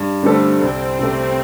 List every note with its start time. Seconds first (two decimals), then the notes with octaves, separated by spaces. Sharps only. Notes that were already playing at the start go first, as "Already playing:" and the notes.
Already playing: G2
0.23 D3 G3 A3 C4 A4
0.61 C2 C4
0.99 C3 A3